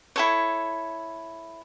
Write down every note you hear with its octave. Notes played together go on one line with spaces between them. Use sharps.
E4 A4 C#5